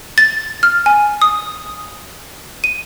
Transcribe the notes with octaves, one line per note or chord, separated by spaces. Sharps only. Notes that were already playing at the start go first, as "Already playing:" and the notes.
A6
F6
G#5
D#6
D#7